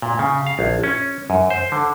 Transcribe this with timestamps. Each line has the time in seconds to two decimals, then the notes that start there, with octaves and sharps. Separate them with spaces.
0.02 A#2
0.19 C#3
0.46 F5
0.59 A#1
0.84 C#4
1.30 F#2
1.50 C5
1.72 D3